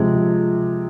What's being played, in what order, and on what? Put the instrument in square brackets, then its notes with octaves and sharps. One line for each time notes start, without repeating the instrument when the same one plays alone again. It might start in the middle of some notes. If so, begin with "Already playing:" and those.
Already playing: [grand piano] C3 F3 G#3